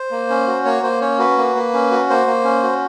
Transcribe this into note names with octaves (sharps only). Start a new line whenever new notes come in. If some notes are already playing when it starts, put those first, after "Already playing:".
Already playing: C5
A#3
C#4
F#4
A#3 C#5
A#3 C5
C#4 C#5
F#4 B4
A#3
A#3
C#4
F#4
A#3 C5
A#3
C#4
F#4